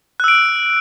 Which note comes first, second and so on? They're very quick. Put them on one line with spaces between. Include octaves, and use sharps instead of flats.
F#6 E6 D7